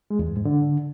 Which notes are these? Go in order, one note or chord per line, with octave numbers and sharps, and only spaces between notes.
G#3
E2
G2
G#2
D3